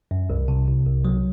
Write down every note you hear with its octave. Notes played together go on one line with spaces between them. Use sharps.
F#2
C2
C3
C3
C2
F#3